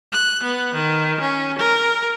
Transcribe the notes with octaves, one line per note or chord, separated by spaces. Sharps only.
F#6
B3
D#3
C#4
A#4